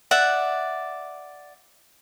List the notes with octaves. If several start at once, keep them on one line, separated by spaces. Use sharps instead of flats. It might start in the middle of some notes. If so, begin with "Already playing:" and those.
D5 E5 F#5